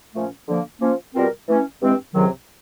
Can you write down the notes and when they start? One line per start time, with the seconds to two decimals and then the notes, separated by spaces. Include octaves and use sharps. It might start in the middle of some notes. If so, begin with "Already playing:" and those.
0.14 A#2 F3 A3 C#4
0.48 D3 F3 A#3
0.81 F3 A#3 C#4
1.14 B2 G3 C4 F4 A#4
1.47 E3 A3 C#4
1.81 G2 E3 G#3 C4
2.14 C#2 C3 D#3 F#3